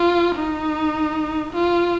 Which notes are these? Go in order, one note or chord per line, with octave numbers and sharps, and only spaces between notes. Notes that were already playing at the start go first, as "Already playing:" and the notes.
Already playing: F4
D#4
F4